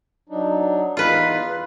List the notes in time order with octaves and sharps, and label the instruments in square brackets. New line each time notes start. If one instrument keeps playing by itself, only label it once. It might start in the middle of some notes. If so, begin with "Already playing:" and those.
[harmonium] F#3 D4 D#4
[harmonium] E2 D#4 [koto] F4 B4